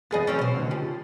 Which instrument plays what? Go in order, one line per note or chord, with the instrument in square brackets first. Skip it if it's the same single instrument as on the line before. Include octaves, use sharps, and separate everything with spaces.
[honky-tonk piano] E2 B5 A6 [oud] B3 G#4 D#5
[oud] F#3 C4 C#4 [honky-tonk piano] A3 C#7
[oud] B2 C5
[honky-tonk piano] C#2 D3 D#3
[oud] F3 [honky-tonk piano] G4